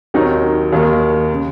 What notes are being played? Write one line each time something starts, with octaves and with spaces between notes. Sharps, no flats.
D#2 D#3 F#3 C4 D#4
D#2 D#3 A#3
C#3